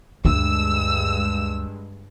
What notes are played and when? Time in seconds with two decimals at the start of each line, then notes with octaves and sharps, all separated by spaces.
0.25 D2 G2 G#3 D4 E6